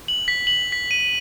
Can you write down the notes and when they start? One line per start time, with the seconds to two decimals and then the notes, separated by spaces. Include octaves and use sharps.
0.08 F#7
0.28 B6
0.47 F#7
0.72 B6
0.91 D#7